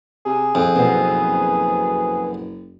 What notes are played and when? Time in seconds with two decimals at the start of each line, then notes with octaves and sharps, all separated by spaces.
0.26 C3 G#4
0.55 C2 F2 G4
0.76 F#1 B2 B3 C4